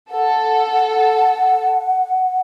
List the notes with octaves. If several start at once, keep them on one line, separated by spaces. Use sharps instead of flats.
A4 F#5